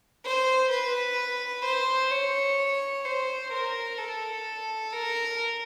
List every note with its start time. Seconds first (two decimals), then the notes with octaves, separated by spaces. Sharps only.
0.24 C5
0.71 B4
1.65 C5
2.11 C#5
3.05 C5
3.52 A#4
3.98 A4
4.92 A#4